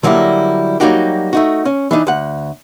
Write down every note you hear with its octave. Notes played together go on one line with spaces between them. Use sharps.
D3 F#3 G3 A#3 E4
F#3 G3 A#3 D#4 F#4 G4
A3 D#4 F#4
C#4
E3 D4 D#4
D2 F#5